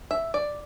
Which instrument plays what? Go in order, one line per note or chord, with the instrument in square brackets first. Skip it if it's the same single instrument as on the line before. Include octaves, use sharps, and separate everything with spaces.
[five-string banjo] E5
D5